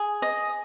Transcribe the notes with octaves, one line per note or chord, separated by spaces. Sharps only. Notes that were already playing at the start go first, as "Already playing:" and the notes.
Already playing: G#4
D#5